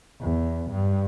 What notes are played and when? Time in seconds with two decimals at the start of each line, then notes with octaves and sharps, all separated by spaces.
0.22 E2
0.71 G2